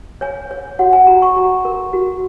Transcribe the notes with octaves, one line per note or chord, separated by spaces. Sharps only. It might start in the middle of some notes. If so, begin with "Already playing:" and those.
C#5 G#5
C#5
F#4 F#5
G#5
F#4 A#5
C#6
F#4 A#5
A#4
F#4